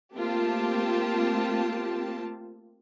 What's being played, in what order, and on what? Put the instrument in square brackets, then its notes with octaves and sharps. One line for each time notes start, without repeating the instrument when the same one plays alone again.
[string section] A3 A#3 C4 F4 G4 A5